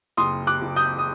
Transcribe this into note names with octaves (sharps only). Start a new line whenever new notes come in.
F#1 C6 D#6
D6 F#6
F#1
D#6 G6
D#6